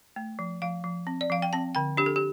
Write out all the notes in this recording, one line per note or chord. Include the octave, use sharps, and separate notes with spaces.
A3
F3
F3 F5
F3
C4
D5
F3 F5
G5
C4 A5
D3 G5
D4 G4
A4
G4